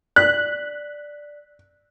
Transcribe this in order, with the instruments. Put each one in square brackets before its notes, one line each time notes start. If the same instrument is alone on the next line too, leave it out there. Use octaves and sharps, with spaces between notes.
[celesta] D5 B6 [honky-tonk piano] F#6